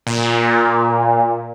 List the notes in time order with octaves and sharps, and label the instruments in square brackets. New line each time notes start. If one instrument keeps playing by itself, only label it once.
[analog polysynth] A#2